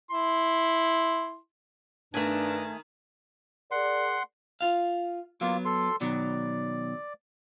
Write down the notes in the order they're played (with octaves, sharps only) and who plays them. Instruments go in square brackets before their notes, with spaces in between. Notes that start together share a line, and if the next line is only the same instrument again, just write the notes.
[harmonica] E4 C6
[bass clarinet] G2 [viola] D#3 [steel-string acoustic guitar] A3 G#5 [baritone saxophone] D4
[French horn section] G#4 A#4 D5 [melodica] F#5 C6
[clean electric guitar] F4 F5
[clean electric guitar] F#3 B3 [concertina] A#3 F4 F5
[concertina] A4 C6
[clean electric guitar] B2 D#3 F#3 [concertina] D5